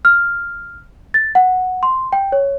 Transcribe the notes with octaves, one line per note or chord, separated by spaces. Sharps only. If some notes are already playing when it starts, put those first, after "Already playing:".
F6
A6
F#5
C6
G5
C#5